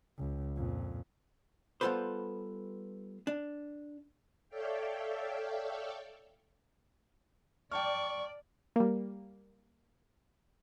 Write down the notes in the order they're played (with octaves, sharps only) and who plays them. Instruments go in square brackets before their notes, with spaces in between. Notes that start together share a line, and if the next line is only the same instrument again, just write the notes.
[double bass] C#2
F2 A#2
[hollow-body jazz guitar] G3 B3 F4 A4 B4 C5
D4
[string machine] A4 C#5 D5 E5 F5 G5
[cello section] D5 [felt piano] G5 A5 F6 [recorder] C#6
[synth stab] G3 A#3